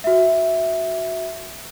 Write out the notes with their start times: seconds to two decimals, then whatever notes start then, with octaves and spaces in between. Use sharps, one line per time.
0.04 F#4 E5